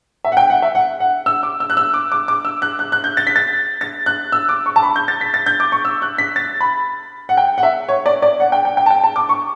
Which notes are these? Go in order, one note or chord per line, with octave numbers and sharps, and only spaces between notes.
E5
F#5
G5
F#5
E5
F#5
F#5
E6
D6
E6
F#6
E6
D6
D6
D6
E6
F#6
F#6
F#6
G6
A6
B6
A6
A6
F#6
E6
D6
C#6
A5
B5
G6
A6
B6
A6
G6
D6
C#6
E6
F#6
B6
A6
B5
F#5
G5
F#5
E5
C#5
D5
D5
F#5
G5
G5
G5
A5
G5
A5
D6
C#6